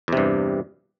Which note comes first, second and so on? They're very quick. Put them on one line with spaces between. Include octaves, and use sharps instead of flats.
E2 C3 G2